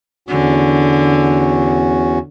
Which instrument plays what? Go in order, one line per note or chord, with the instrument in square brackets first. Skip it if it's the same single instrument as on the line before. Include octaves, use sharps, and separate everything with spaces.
[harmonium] E2 C#4 F#4 [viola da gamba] D3